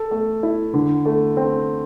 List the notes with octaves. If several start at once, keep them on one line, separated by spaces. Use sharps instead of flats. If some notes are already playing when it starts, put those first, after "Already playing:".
Already playing: A4
A3
E4
D3
A3
C4